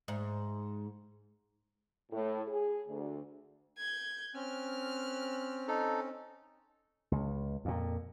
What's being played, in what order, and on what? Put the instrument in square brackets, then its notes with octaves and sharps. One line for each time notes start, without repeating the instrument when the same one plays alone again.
[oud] G#2
[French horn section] A2
G#4
D2
[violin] G6 G#6
[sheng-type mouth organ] C4 C#4 [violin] F6 F#6
[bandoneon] D#4 A4
[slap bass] C#2
F2 A#2